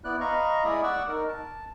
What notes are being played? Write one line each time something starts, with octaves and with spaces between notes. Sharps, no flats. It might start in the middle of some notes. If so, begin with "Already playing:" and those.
B3 E4 D5 F#6
D#5 F5 A#5 B5 C#6
G#3 E4 D5 E5 D#6
D5 F#5 C#6 E6
D#4 A#4
A5